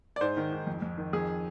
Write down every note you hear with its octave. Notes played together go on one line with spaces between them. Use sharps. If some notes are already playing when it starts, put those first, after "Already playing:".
D5
G#2 C5
D#3
G#2
F2
F2
D#3
F2 G#4